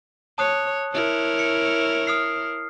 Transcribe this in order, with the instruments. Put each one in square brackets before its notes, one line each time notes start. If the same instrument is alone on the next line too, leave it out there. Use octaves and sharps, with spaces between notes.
[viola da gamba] C#5 [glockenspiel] A5 D#6 F#6
[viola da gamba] E4 A#4 C#5
[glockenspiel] C#7
D#6 F6 C7